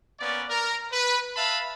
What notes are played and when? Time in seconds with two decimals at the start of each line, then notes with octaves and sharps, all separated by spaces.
0.20 A#3 B3 C#4 D5
0.50 A#4
0.92 B4
1.36 B4 E5 F5 A5 B5